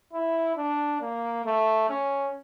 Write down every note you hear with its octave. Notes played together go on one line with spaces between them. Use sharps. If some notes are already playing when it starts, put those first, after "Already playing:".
E4
D4
A#3
A3
C#4